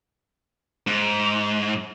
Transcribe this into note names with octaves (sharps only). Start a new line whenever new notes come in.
G#2